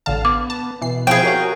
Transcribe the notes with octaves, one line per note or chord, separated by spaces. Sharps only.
A1 D3 F5 A5
B3 D6
A5
B2 E3 C7
F3 C4 E4 G#4 G5
F#4 G4 A#4 C#5 F5